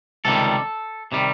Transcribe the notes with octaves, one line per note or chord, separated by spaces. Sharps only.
C#2 C3 D#3 G3 A4
C3 D#3 G3